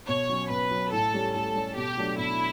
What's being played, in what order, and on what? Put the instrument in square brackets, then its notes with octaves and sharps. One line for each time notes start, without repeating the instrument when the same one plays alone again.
[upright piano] B2 [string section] C#5
[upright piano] F#3 C#4
[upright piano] B2 [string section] B4
[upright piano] F#3 C#4
[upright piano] A2 [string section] A4
[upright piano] G3 C#4 G4
[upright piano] A2 [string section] A4
[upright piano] G3 C#4 G4
[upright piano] B2 [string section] G4
[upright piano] F#3 A3 D4
[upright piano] B2 [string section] E4